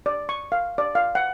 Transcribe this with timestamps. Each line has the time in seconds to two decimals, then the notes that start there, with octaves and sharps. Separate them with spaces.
0.06 D5
0.29 C#6
0.52 F5
0.78 D5
0.95 F5
1.15 F#5